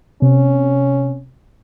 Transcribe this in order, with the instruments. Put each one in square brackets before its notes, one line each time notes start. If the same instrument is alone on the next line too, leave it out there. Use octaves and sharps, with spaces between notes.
[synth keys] C3 [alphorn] C#4